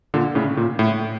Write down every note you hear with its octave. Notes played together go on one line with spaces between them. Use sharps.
A#2 D3
A2 C#3
A#2
A2